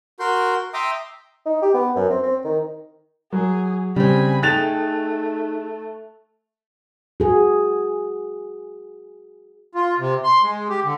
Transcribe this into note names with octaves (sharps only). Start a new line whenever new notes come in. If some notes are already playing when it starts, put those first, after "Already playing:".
F#4 A#4 C6 G6
E5 G5 A#5 C6 D6 D#6
D#4
G4
B3
F#2
C4
C4
D#3
F#3 G#4
C#3 G3 C4 G#5 B5
A3 D#4 G#4 G5 F#6 A6 F7
F#4 G#4
F4
C3
C6
G#3
G4
D3